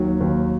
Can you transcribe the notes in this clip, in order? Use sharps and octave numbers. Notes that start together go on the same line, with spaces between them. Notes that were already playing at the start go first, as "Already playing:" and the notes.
Already playing: D#2 D#3 F#3
D#2